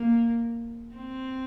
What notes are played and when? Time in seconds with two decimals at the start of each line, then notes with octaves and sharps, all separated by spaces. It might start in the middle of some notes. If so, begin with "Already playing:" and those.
Already playing: A#3
0.95 C4